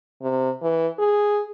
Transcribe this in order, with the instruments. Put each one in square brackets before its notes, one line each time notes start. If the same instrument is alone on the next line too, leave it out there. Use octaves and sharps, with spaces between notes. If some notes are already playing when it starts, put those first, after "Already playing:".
[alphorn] C3
E3
G#4